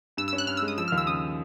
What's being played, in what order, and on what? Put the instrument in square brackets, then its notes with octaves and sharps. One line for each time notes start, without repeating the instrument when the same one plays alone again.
[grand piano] G2 [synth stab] E6
[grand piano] C#4 [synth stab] E6
[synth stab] F#6
[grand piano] G2 [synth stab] F6
[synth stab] E6
[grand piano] G#3
[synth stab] D#6
[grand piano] F3 [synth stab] E6
[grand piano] D#2 [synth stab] F6
[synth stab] E6
[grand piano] C#3 [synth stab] D#6